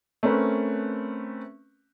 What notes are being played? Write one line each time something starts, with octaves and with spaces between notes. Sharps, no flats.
A3 C4 C#4 A#4 B4